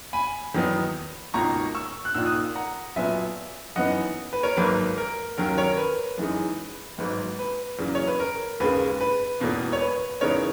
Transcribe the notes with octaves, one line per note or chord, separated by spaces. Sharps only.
G#5 B5
E2 D#3 F#3 B3 D#4
C#2 B2 A#3 D#4 A#5 C#6
C#6 E6
F#6
A#1 A#2 A#3 D#4 E6
D#6 F#6
F#5 A#5
B1 A#2 F#3 B3 E5 G#5
F#2 E3 B3 D#4 D#5 F#5
B4
A#4 C#5
G#1 G#2 F#3 A#3 B4
A#4
D#2 D#3 F#3 C#4 A#4
A#4 C#5
B4
F#2 E3 G#3 D#4
G#1 G#2 F#3 B4
B4
E2 C#3 F#3 A#3
C#5
B4
A#4
D#2 C#3 G#3 B4
B4
E1 E2 B2 A#3
C#5
B4
E2 C#3 G#3 B3 D#4 A#4 C#5